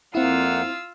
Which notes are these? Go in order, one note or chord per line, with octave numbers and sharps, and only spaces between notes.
F2 A#3 C4 E4 F4 F5 F#5 E6